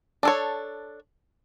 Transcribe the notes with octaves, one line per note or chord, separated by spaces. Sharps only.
D4 A4 C#5